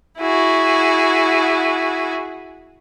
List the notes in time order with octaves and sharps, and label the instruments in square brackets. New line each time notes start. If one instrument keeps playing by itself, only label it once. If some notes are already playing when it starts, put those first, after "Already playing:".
[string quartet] E4 F#4 G#4